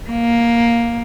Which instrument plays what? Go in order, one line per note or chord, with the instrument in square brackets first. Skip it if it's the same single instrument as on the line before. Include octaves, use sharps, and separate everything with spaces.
[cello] A#3